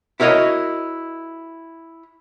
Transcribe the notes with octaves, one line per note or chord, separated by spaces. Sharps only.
E4 F#4 A#4 C#5 D#5